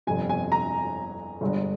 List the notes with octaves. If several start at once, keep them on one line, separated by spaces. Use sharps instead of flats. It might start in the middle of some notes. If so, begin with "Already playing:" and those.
G1 F2 C3 G#5
G#5
A#5
G1 G2 D3 G#3